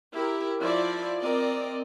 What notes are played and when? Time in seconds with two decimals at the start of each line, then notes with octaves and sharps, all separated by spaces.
0.11 E4 G4 A#4
0.59 F3 E4 D5
1.18 C4 A#4 D5 D#5